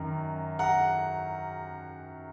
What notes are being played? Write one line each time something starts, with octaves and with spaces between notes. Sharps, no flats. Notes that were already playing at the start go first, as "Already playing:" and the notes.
Already playing: F#2 D#3
F#5 A#5